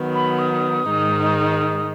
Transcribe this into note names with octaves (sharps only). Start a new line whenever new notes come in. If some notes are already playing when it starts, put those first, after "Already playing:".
Already playing: D#3 F#3 B3
B5
D#6
G#2 D#3 G#3 D#4